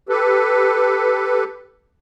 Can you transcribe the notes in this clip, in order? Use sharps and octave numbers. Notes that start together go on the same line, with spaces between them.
G4 A4 B4